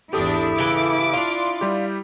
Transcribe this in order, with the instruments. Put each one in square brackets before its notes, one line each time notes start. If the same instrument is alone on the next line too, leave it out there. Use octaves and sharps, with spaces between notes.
[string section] G#1 E2 D4 [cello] E4 [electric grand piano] G4 A4 D#6
[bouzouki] C#3 E3 [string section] D6
[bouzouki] D4 F4
[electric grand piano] G3 E4 G4